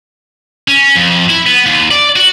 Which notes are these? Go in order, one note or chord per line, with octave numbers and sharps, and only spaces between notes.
C#4
F2
E4
B3
D#2
D5
F#4